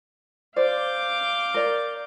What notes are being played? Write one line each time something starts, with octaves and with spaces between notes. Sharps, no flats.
C5 D5 F5 D6 G6
A#4 D5